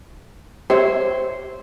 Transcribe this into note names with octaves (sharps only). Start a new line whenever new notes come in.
G4 C5 C#5 E5